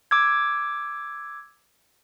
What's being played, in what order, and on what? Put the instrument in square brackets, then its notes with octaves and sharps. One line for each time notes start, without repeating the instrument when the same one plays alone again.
[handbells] D6 E6 G#6